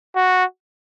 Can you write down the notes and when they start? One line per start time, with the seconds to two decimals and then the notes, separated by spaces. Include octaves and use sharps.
0.16 F#4